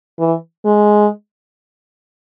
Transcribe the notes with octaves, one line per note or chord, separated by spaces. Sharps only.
E3
G#3